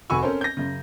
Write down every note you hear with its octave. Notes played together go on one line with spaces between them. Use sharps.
F1 F#4 G#5 B5 C#6 E6
C4 C#4 A4 A#4 C5
G6 A#6
F#2 C#3